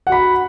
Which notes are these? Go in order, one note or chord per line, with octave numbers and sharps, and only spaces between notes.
F#4 F#5 B5